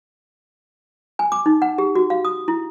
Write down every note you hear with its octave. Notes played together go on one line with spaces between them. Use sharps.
G#5
D6
D#4
F#5
G4
F#4
F5
D#6
E4